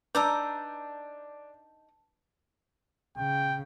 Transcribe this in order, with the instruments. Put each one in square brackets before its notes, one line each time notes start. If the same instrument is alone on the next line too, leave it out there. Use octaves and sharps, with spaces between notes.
[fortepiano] D4 [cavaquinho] D#4 A#5 D6 [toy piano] B4 E6 [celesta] A5 G6
[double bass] C#3 [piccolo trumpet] G5